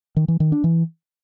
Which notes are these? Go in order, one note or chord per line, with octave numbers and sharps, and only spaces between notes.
D#3
E3
D#3
D4
E3